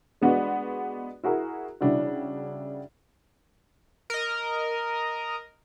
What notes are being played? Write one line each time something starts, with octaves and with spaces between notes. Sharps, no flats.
G#3 B3 D4 F#4
E4 F#4 G#4 A#4
C#3 G3 D4 E4 F#4
A#4 D#5